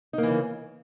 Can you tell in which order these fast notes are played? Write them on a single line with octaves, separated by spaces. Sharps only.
D#4 A#3 E3 C#3